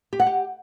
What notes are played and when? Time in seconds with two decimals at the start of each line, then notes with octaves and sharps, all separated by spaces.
0.13 G4
0.20 F#5
0.27 G4